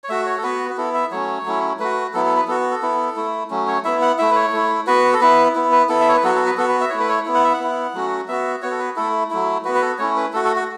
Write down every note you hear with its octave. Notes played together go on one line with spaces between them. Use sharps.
C#5
A3 F#4 E5
C#5
A4
B3 F#4 B4
F#4
B3 E4 A4
E5
F#3 A3 C#4 C#5
F#3 A3 C#4 E4
A3 F#4 B4
F#3 B3 E4 A4
A4
B4
B3 F#4 A4
A4
B3 E4
A3 E4
F#3 A3 C#4
C#5
B3 E4 E5
F#5
A3 E4 E5
B4
C#5
A3 E4
B3 F#4 B4
A4
B3 E4 B4
B3 E4
B4
B3 E4 A4
E5
C#5
B4
F#3 B3 F#4 A4
A4
B4
B3 F#4 A4
B4
E5
A3 E4 C#5
B4
C#5
B3 E4
F#5
E5
F#5
B3 E4
F#3 A3 C#4 F#4
B3 F#4 E5
B3 F#4 C#5
A4
B4
A3 E4 A4
F#3 A3 E4
B3 F#4 B4
B4
A4
A3 C#4 E4 C#5
B4
A3 F#4 A4
A4
F#4